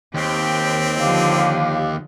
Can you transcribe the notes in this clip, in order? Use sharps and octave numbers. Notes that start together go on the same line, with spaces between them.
D#2 C4 G4
D3 F3 G4 F5 D6